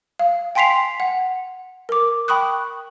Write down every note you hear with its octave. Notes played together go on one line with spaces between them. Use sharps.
F5
G5 G#5 C6 B6 C7 F7
F#5
A#4 D6
G5 B5 C#6 D#6 F#6